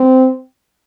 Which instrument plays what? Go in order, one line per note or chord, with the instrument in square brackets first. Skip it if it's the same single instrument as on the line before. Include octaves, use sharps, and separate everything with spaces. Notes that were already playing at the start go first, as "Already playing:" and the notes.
Already playing: [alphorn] C4